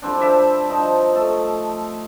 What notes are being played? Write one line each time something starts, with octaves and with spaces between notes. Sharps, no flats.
F3 G3 C4 D4
D5 E5 G5 A5
F3 D#4
A3 A4